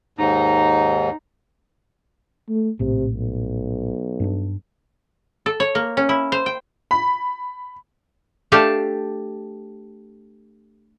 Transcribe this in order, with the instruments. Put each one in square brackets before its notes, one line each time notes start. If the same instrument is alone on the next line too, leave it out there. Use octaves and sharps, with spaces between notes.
[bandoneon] D#2 G#2 [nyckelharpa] D#4 A#5
[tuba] A3
[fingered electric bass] A#1 A2 [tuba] C3
[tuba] B1
[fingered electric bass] G2 C4 D4
[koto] A4
C#5
A#3
C#4
E4
C5
G5
[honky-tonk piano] B5
[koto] A3 D4 G4 A4 F5 A5